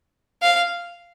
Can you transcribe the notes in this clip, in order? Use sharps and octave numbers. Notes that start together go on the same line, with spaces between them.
F5